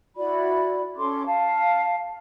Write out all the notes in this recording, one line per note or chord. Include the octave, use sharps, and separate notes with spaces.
E4 F#4 D5 B5
C#4 A4 C6 D6
F5 A5